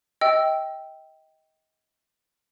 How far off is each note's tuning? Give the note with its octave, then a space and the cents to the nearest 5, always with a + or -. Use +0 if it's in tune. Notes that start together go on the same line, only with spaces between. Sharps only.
D#5 +30 G5 +0 E6 +0